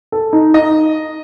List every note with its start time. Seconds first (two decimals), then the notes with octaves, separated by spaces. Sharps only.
0.12 A4
0.33 D#4
0.54 D#4 D#5